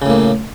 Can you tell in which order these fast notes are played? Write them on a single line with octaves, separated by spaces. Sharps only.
C#3 A2 A#3